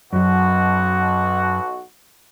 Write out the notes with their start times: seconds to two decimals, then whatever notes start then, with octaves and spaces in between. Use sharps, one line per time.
0.13 B1 F#2 B2 F#3 F#4